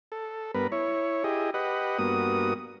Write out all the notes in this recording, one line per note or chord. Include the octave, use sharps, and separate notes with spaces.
A4
G2 B3 A#4 B4
E4 C#5
E4 G4 G#4 D#5
G4 B4 D#5 F#5
G2 A#3 B3 F#4 D#6